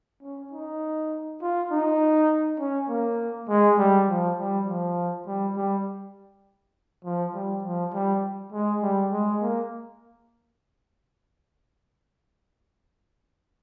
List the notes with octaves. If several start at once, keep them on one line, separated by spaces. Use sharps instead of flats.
C#4
D#4
F4
D#4
C#4
A#3
G#3
G3
F3
G3
F3
G3
G3
F3
G3
F3
G3
G#3
G3
G#3
A#3